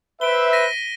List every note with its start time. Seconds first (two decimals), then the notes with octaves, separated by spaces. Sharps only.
0.21 B4 C5 E5 D7 G7
0.53 A#6 B6 D#7